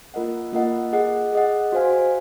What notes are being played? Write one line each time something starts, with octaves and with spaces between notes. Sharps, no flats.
A#3 F4 A#4 D#5 F#5
A#3 F4 A#4 D#5 F#5
G#4 D#5 F#5
G#4 D#5 F#5
F#4 C5 F5 G#5